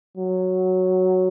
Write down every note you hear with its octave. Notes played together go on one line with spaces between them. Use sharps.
F#3